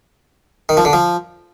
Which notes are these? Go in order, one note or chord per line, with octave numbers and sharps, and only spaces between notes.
D#3
F3
D3
F3